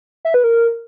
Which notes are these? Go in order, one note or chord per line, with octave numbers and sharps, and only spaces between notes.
E5
B4
A#4